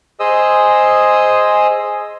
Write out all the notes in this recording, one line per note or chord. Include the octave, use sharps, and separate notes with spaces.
G#4 C5 D#5 D#6 E6